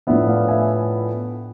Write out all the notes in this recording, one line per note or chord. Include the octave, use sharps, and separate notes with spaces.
A2 F3 B3 D4 E5
D5 F5
E5 G#5